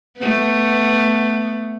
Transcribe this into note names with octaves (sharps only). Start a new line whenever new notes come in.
A3 B3